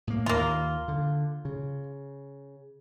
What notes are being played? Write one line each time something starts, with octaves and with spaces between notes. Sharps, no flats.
A2 A#3
D#2 D#3 A#3 F4
D3
C#3